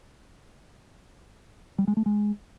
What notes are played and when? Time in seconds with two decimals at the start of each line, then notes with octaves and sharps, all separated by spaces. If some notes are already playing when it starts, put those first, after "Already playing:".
1.78 G3
1.88 G#3
1.97 A3
2.06 G#3